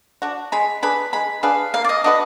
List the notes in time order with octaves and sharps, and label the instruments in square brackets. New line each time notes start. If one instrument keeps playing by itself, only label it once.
[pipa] D4 F#4
[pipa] G#3 [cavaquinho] B5
[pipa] D4 G#4 B4 [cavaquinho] B5
[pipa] G#3 [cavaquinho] B5
[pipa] D4 G#4 B4 [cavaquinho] F5
[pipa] A#3 [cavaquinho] F5
[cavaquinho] D5
D#5
[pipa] D4 F#4 B4 [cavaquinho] D#5